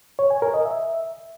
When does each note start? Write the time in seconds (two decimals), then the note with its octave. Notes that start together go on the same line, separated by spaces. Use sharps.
0.19 C#5
0.30 G#5
0.42 A#4
0.54 D#5
0.66 E5